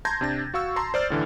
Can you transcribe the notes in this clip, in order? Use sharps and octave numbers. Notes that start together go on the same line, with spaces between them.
A5 A#5 C6 G6 G#6 A#6
C3 D4 A6
F#4 F5 C#6 E6
A5 A#5 C6
C5 D5 F6 A6
A2 D3 E3